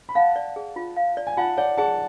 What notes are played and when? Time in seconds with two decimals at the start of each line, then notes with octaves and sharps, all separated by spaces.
0.09 B5
0.15 F5 F#5 A5
0.36 D5
0.56 G#4
0.76 F4
0.97 F5
1.17 D5
1.27 G#5
1.37 F4 F#5 A5
1.57 C#5 D5 F#5
1.78 G#4 F#5 A5